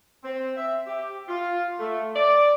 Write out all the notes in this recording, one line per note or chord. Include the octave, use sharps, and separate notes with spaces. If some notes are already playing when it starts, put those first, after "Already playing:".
C4
E5
G4
F4
A3
D5